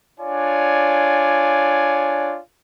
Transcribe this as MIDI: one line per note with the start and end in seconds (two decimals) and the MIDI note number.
0.20 2.40 62
0.20 2.40 65
0.20 2.40 73
0.20 2.40 74
0.20 2.40 80